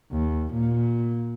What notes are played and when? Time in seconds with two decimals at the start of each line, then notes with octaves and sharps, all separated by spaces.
0.12 D#2
0.54 A#2